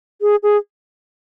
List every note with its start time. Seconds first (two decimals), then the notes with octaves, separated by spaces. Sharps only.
0.21 G#4
0.43 G#4